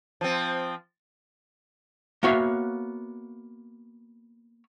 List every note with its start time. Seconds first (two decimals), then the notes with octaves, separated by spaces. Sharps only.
0.21 F3 C4
2.23 A#3 B3 F#4 C#5 E5 F5